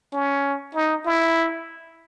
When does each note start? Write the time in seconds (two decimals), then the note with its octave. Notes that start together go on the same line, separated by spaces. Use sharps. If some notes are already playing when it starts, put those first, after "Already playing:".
0.13 C#4
0.75 D#4
1.05 E4